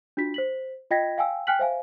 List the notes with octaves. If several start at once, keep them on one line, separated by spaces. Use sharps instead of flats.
D4 F4 F#4 B6
C5 B6 F#7
F4 D#5 G5 G#6 A#6 B6
F5 G5 G#5 E6
G5 G#5 F6 F#6 B6 F#7
C5 E5 F5 G#5